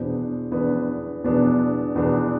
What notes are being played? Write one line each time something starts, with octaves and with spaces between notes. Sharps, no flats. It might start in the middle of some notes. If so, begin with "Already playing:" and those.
Already playing: E2 B2 B3 D4 C5
E2 B2 B3 D4
E2 B2 B3 D4
E2 B2 B3 D4